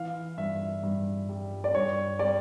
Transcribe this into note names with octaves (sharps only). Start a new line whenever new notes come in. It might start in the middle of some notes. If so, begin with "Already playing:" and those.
Already playing: E3 F5
G2 E5
G2
G3
D5
G2 C#5
G3 D5